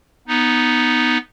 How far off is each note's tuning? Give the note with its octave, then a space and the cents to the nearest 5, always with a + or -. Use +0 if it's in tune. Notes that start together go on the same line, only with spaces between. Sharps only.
B3 +0 D#4 +0